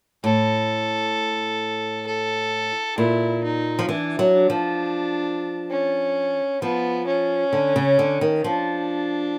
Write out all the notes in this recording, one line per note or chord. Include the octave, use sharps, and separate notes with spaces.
A2 A4
A4
A#2 E4
D#4
F3
E3 D4
F#3
D4
F3
C#4
F3 B3
C#4
D3
C#3
D3
D#3
F3 D4